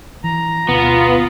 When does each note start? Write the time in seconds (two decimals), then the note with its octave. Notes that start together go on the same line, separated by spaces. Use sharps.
0.24 E3 A#5
0.69 D2 B2 B3 F4